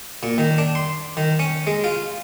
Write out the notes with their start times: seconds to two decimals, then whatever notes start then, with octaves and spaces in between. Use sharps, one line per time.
0.23 A#2
0.38 D#3
0.58 D4
0.75 C6
1.17 D#3
1.39 C#4
1.67 G#3
1.84 F4